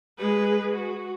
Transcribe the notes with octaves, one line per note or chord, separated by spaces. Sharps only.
G#3 B4
F#4